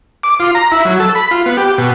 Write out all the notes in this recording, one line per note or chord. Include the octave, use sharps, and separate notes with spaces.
D6
F4
A#5
E4
F#3
A4
B5
F4
B3
G4
B2